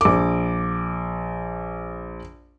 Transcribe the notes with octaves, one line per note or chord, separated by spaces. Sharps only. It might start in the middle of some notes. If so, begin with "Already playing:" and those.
A#1 D6